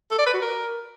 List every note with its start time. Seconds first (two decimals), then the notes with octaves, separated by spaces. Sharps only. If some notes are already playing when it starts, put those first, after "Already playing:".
0.11 A4
0.19 D5
0.27 B4
0.34 F#4
0.42 A#4